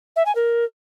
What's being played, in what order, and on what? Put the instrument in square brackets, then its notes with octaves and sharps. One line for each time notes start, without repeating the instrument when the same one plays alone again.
[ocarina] E5
G#5
A#4